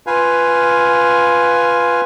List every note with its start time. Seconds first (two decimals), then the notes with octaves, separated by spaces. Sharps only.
0.07 F4 B4 F5 G#5